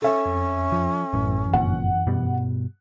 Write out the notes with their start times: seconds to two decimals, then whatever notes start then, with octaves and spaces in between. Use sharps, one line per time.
0.02 C#4 A4 E5
0.26 F2
0.72 F3
1.13 A1 F#2 E3
1.53 G1 F2 A#2 F#5
2.07 G2 B2 G3